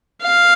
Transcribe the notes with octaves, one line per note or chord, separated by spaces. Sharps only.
F5